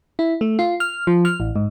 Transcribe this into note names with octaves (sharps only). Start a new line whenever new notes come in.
E4
A3
F4
F6
F3
F6
A1
G#2